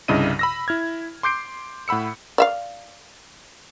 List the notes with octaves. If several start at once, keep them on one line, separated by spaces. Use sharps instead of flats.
C2 G2 C#3 E4 D#5 D#7
B5 E6 A#6
E4 F6 G#6
C6 D6 G6 C7 D7
A2 F#5 B5 E6 C#7
D5 E5 F5